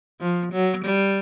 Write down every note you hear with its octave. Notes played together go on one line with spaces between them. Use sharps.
F3
F#3
G3